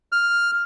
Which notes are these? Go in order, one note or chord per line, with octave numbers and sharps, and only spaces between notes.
F6